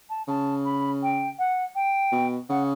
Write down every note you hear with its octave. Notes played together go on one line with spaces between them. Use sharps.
A5
C#3 A5
B5
G5
F#5
G5
B2
C#3 F#5